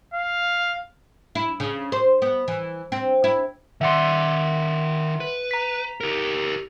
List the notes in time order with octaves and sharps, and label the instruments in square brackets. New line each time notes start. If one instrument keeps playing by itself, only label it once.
[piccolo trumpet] F5
[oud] E4
C#3
C5
B3
E3
C4
E4
[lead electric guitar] D#3 D5 [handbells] E5 F#5 C6
[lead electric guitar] B4
[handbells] A#5 B6
[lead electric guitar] G4 A#4